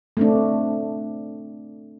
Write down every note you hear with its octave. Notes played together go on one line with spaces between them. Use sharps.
A3 C4 D4